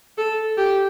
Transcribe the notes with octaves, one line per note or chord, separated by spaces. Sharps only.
A4
G4